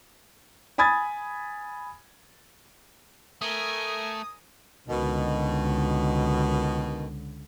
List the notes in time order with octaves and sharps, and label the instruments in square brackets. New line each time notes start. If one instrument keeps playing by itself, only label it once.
[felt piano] G#5 B5 D#6 G#6 A6
[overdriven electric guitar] A3 [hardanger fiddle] A#4 G#5 [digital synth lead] D#6
[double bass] C#2 D3 [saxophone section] B2 D#3